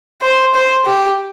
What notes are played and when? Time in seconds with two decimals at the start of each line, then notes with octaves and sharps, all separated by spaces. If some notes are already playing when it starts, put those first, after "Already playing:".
0.22 C5
0.54 C5
0.86 G4